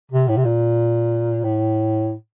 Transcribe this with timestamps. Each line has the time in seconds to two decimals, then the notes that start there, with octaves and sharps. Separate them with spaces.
0.11 C3
0.28 A2
0.37 C3
0.45 A#2
1.44 A2